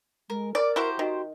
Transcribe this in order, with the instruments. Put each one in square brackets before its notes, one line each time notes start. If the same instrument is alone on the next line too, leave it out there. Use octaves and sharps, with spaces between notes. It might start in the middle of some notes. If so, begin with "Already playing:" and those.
[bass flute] G#3 [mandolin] A#4
[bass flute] A#4 [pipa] D5 [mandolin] D6
[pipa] E4 F#4 [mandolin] G4 C5 A#5
[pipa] D#3 [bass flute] F#4